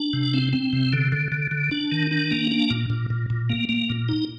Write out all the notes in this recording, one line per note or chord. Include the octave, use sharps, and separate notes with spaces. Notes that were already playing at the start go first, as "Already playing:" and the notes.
Already playing: D4
C3
C4
C4
C3
D3
D3
D3
D3
D4
D#3
D4
A#3
D4
A#2
A#2
A#2
A#2
A#3
A#3
A#2
D#4